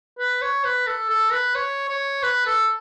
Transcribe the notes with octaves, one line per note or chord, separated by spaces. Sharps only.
B4
C#5
B4
A4
A4
B4
C#5
C#5
B4
A4